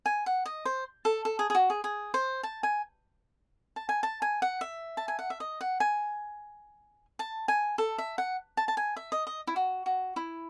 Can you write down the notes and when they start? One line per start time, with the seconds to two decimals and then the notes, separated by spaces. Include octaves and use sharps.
0.06 G#5
0.26 F#5
0.46 D#5
0.65 C5
1.05 A4
1.25 A4
1.39 G#4
1.50 G#4
1.55 F#4
1.70 G#4
1.84 G#4
2.14 C5
2.43 A5
2.63 G#5
3.76 A5
3.89 G#5
4.03 A5
4.22 G#5
4.42 F#5
4.61 E5
4.97 A5
5.08 G#5
5.19 F#5
5.30 E5
5.40 D#5
5.61 F#5
5.80 G#5
7.19 A5
7.48 G#5
7.78 A4
7.98 E5
8.18 F#5
8.57 A5
8.68 A5
8.77 G#5
8.96 E5
9.12 D#5
9.27 D#5
9.47 E4
9.56 F#4
9.86 F#4
10.16 E4